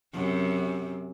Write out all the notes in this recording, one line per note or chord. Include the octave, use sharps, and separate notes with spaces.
F#2 C3